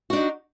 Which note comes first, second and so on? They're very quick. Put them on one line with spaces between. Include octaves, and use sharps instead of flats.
F#4 D4 D#4